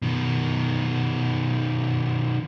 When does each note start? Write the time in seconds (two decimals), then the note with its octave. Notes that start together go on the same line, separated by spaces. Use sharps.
0.02 B2 D#3